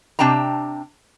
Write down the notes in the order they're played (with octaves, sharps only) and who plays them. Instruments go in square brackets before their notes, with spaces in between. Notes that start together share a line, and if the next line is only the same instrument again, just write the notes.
[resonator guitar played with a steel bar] C3 D4 G5 A5 A#5